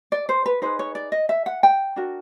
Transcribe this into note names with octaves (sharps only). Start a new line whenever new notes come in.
D5
C5
B4
D#4 G#4 B4 C5
C#5
D5
D#5
E5
F#5
G5
D4 F#4 A#4